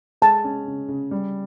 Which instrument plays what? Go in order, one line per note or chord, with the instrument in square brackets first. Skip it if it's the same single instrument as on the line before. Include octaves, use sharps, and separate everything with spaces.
[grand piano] G#3 [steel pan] A5
[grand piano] C#4
C#3
C#3
G3